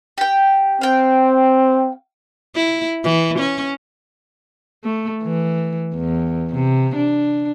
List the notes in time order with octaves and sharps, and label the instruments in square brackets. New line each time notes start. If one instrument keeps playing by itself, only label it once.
[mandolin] G4 G5
[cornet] C4 [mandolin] F5 G5
[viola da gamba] E4
E3
C#4
A3
E3
E2
C3
D4